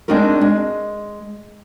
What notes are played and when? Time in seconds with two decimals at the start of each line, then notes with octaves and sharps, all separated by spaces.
0.08 G#3 C4 D4 D#4 F#4 A#4
0.41 G#3